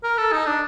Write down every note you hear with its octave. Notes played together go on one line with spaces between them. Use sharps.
A#4
A4
D#4
D4